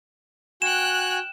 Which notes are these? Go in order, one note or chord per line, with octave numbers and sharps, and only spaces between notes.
F#4 G5 G#5 F#6 E7